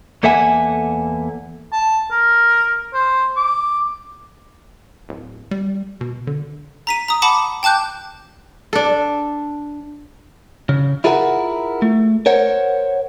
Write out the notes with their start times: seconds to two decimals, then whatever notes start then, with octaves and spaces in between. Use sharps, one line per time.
0.23 E2 A#3 A4 E5 F#5 G#5
1.73 A5
2.11 A#4
2.94 C5
3.37 D6
5.09 D1
5.51 G3
6.01 B2
6.27 D3
6.87 A#5 B6 D#7
7.08 A#5 D#6
7.22 F#5 A5 B5 D6
7.63 G5 A5 D6 F#6 G6
8.73 D4 A4
10.69 C#3
11.04 E4 F4 G#4 A#4 E5 F#5
11.82 A3
12.26 A#4 C5 C#5 F#5